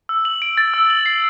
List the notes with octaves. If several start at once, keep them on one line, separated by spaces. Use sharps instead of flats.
E6
F#7
D7
A6
E6
F#7
C7